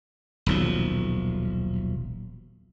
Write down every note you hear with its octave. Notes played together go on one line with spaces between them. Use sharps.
D#1 B1 F3